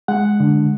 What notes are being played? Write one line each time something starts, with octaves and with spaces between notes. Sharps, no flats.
G#3 F#5
D3